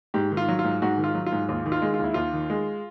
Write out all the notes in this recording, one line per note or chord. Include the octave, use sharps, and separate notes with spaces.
G#2 G4
D#3
F4
F#3
F4
G#2
G#2 F#4
D#3
F4
F#3
F4
G#2
D#2 F4
D#3
F4
G#3
F4
D#2 E4
D#2 F4
D#3
G#3